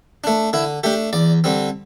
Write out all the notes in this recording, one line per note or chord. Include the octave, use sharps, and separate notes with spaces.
A3 D4
D3 E4
A3 D4 G4
E2 D5
D3 G3 C4